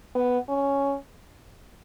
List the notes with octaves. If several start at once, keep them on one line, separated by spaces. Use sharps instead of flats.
B3
C#4